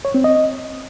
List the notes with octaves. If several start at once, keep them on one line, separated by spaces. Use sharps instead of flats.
C#5
C4
D#5